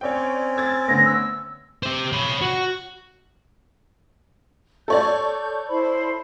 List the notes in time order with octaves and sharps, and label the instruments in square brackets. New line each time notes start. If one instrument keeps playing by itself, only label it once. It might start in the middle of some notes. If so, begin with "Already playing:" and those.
[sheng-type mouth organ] C4 C#4 [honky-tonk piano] C#5 D5 G5
[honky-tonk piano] E6 G#6 A6
[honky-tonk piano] D3 A3 B3 [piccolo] A#6
[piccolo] E6
[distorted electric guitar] G4 C5
C#5 B5
F#4
[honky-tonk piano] A4 C#5 D5 [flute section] G6
[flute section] E4 C5 B5